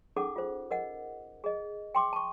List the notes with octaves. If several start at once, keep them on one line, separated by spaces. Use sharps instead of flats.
C#4 D#4 G#4 A4 F#5 D6
F4 C5
A#4 D#5 F#5
G#4 D#5
G5 C6 D6
A5 C#6